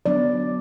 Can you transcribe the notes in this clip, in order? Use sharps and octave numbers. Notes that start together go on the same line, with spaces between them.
F#3 B3 D4 D5